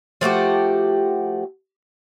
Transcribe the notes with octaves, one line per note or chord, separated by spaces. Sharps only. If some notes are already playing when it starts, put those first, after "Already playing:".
F3 A3 F#4 G4